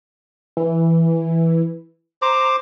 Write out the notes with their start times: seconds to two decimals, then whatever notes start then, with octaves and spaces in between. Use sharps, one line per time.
0.57 E3
2.22 C5 A#5 D6